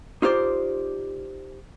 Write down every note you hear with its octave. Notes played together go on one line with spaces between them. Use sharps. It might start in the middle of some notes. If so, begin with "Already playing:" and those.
D#4 F4 G4 C5 D5